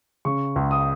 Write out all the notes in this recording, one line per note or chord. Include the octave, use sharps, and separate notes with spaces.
C#3 C#6
C#2
D#6